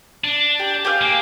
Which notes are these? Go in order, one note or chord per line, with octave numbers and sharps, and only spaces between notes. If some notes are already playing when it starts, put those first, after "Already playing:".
D4
G4
G4 G#4 F5
A#3